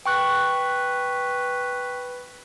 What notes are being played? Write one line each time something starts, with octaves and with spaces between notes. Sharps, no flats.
B4 G5 C#6 F#6